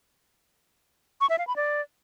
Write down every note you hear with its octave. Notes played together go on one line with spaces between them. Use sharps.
C#6
E5
F5
B5
D5